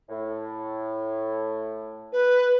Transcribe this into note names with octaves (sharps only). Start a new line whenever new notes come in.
A2
B4